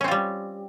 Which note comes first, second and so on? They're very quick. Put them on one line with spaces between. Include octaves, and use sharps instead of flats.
C#4 C4 F4 G3